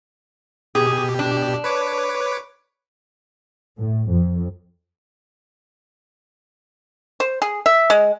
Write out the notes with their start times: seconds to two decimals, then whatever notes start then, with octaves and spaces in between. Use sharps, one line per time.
0.75 B2 G4 G#4
1.19 D4
1.64 B4 C#5 D6
3.78 A2
4.09 F2
7.20 C5
7.42 G#4
7.66 E5
7.90 G#3